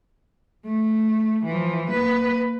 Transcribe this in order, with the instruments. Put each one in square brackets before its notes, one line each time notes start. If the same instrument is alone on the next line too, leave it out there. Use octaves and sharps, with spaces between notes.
[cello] A3
E3 F3
A#3 B4